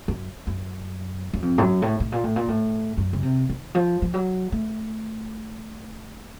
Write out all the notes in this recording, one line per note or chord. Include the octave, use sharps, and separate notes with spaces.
F#2
F#2
F#2
F2
A2
F#2
A2
A2
A#2
A2
A#2
A2
F#2
C#3
C3
D#3
F3
F3
F#3
A3